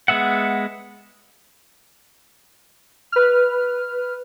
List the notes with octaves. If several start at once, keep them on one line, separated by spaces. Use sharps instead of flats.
G#3 B3 E5 F#5
B4 F6